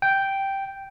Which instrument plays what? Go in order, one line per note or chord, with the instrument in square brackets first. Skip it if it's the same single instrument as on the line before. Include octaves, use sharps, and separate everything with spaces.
[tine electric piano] G5